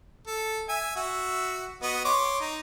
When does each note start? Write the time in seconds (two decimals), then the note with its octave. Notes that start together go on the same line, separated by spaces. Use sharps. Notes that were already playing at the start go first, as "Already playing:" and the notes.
0.27 A4
0.69 E5 G#5
0.96 F#4 E5
1.83 B3 F#4 D#5
2.05 C#5 C6 D6
2.41 D#4